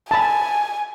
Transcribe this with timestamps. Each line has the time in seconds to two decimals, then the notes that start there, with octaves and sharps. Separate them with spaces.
0.11 G#5 A5 B5